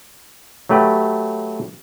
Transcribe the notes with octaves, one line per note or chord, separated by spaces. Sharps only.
F#3 A3 G4 B4 G5